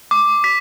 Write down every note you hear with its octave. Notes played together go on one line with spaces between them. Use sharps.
D6
B6